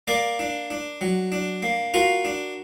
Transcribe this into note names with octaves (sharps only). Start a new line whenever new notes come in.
A#3 A#4 D5
D4
D4
F#3
D4
A#3
F4 F#4 A#4
D4